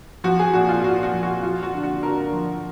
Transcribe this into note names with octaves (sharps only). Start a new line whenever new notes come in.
F3 F#4
G#4
A#2 F#4
F4
A#2 F#4
F#4
F3
F#4
F3 F4
F#4
D3
F#4
D3 A#4
F3